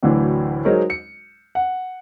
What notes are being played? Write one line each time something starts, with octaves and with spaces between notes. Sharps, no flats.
D2 A2 D3 E3 F#3
F#3 G#3 D#4 A#4 C5 C#5
C#7
F#5